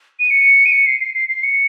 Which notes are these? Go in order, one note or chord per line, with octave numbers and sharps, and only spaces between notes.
D#7
C#7
D#7
C#7
C7
C7
C7
C7
C#7